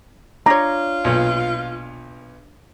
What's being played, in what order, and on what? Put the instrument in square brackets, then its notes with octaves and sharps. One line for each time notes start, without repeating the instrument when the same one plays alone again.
[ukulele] D4 C#5 [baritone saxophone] F4 [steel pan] A#5
[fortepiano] B1 A#2